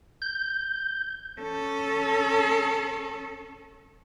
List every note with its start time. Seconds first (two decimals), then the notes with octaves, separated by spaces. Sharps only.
0.22 G6
1.41 C#4 A4